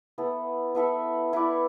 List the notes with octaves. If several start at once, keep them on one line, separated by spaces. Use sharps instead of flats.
B3 E4 A4
B3 E4 A4 E5
E4 B4 D5